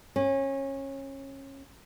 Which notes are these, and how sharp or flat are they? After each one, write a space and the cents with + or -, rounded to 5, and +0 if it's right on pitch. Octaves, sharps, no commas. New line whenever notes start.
C#4 -25